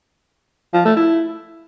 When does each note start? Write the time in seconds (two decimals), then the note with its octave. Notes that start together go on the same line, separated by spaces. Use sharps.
0.74 F3
0.85 A3
0.97 E4